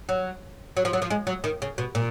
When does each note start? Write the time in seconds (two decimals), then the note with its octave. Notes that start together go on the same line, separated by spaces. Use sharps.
0.09 F#3
0.77 F#3
0.85 F3
0.93 F#3
1.02 F3
1.10 G#3
1.27 F#3
1.44 D#3
1.62 C#3
1.78 B2
1.95 A#2